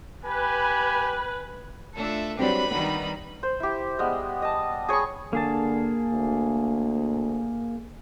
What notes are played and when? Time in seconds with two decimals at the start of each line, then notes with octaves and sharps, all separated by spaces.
0.25 G4 B4 G#5
1.95 A3 D4 F4 A4 E5
2.39 F#3 G3 C4 D4 F#4 G4 B4 B5
2.71 D#3 G3 B3 D#4
3.43 C5
3.60 E4 G4
3.99 G3 G#3 B3
4.42 D#5 A5
4.89 G#4 C#5 B5 C#6
5.33 D3 A#3 G#4 A5
6.13 D2